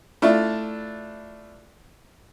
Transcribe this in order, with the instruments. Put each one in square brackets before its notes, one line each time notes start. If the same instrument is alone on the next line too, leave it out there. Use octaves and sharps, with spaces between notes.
[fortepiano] A3 D4 E4 F4